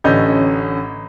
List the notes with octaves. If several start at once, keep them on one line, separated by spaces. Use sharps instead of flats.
A1 D3 C#4 D#5 G6